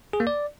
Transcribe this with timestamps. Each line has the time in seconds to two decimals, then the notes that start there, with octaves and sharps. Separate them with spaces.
0.13 G#4
0.20 A#3
0.27 D5